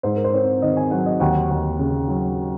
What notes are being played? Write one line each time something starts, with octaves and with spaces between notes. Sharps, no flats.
G#2 C5
A#4
C5
C4 C#5
D#3 D#5
G#5
F#3 F#5
D#5
D#2 F#5
D#2
C#3
F#3